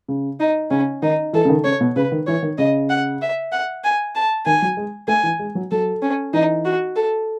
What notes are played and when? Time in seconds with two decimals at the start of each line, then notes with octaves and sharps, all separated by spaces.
0.08 C#3
0.40 D#4
0.70 C#3 C#4
1.02 D#3 D#4
1.33 E3 A4
1.45 C#3
1.49 D#3
1.64 C#3 C#5
1.81 B2
1.96 C#3 B4
2.12 D#3
2.27 E3 C#5
2.42 D#3
2.58 C#3 D#5
2.89 F#5
3.21 E5
3.52 F#5
3.84 G#5
4.15 A5
4.46 D#3 G#5
4.62 F#3
4.77 G#3
5.08 A3 G#5
5.23 E3
5.39 G#3
5.55 F#3
5.71 F#3 A4
6.02 C#4
6.33 E3 D#4
6.65 F#4
6.96 A4